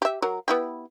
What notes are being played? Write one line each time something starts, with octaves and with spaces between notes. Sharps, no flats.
G4 E5
F#3 A#4
B3 E4 G4